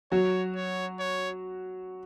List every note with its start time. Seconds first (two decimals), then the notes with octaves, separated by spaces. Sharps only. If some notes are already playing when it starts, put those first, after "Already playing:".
0.12 F#3 F#4 C#5
0.56 C#5
1.00 C#5